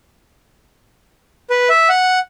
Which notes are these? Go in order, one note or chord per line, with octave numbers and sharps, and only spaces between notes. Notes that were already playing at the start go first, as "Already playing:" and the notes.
B4
E5
F#5